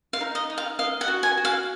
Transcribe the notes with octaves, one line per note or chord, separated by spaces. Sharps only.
F5
D#4
D#5
D#4
F5
D#5 F5
F#5
F#4
G#5
F#4
F5